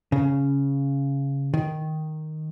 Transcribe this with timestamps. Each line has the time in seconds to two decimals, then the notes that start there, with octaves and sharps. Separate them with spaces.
0.12 C#3
1.54 D#3